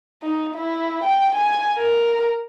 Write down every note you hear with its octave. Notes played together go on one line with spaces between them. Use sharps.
D#4
E4
G5
G#5
A#4